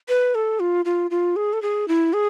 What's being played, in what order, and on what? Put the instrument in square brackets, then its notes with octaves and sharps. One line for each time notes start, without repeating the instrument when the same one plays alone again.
[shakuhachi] B4
A4
F4
F4
F4
G#4
A4
G#4
E4
G#4